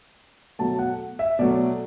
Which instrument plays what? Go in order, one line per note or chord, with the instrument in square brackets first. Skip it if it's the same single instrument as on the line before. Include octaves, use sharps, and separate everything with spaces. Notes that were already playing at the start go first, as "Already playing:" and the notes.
[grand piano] B2 F#3 A3 A5
F#5
E5
B2 F#3 A3 D5